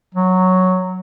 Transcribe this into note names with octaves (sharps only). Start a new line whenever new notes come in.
F#3